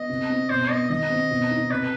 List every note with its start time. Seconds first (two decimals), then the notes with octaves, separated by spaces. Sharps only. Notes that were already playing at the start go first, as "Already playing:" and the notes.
Already playing: B3 D#5
0.09 C3
0.30 C4
0.50 B2 C5
0.69 B3 D#5
0.90 D#3 D#5
1.10 C4
1.31 B2
1.50 D#4
1.70 C3 B4